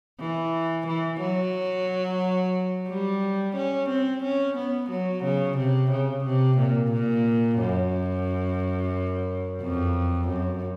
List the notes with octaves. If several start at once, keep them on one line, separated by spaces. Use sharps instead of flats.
E3
E3
F#3
G3
C#4
C4
C#4
B3
F#3
C#3
C3
C#3
C3
A#2
A#2
F#2
F2
F#2